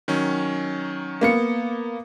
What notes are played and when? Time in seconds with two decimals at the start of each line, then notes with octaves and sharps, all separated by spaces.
0.08 D#3 F#3 C#4
1.21 A#3 B3 C#7